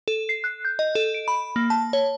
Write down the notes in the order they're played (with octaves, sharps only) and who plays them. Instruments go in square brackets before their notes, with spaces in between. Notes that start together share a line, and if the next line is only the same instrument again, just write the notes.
[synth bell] A4
C7
F#6
G6
D#5
A4
D7
B5
A#3
A5
C#5